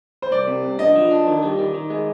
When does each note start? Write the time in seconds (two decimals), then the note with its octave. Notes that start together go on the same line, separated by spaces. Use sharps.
0.22 C5
0.31 C2 D5
0.47 C3
0.64 C2
0.79 D3 D#5
0.96 F3
1.11 D4
1.27 D#3
1.43 G3
1.59 D#3
1.74 D#3
1.90 G#3